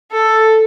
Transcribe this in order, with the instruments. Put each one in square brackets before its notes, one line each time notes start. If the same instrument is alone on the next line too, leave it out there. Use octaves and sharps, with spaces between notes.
[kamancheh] A4